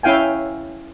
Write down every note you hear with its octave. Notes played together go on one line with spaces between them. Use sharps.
C#4 E4 F5 G5 G#5